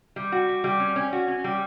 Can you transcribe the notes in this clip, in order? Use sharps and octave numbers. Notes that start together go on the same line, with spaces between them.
G3
F#4
G3
G3
C#4
C#4
F#4
C#4
G3